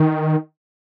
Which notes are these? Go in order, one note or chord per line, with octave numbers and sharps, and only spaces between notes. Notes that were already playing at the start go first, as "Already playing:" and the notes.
Already playing: D#3